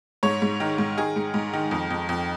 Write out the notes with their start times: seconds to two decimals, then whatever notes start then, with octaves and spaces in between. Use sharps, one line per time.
0.23 G#2 C#5
0.42 G#2
0.60 D#3
0.78 G#2
0.97 D#3 G#4
1.16 G#2
1.34 G#2
1.53 D#3
1.71 F2
1.90 F2
2.09 F2